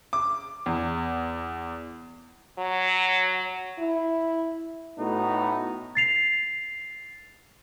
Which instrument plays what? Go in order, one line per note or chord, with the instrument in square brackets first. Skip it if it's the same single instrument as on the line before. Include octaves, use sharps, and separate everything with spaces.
[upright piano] D6
E2
[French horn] F#3
[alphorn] E4
[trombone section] A2 A3 B3 D#4 F#4
[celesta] A6 C7 F7